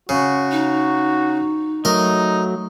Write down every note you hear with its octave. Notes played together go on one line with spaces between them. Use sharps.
C#3 F#4
D#4
F#3 A3 D#4 A#4